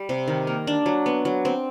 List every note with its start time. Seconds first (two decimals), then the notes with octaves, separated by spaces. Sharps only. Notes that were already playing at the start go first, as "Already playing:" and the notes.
Already playing: G3
0.09 C3
0.28 D#3
0.47 A#3
0.67 D4
0.86 F#3
1.06 B3
1.25 F#3
1.45 C4